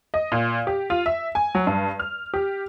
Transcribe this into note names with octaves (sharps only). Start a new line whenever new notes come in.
D#5
A#2
G4
F4
E5
G#5
F#3
G2
F6
G4